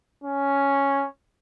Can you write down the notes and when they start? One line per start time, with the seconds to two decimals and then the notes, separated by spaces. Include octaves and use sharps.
0.24 C#4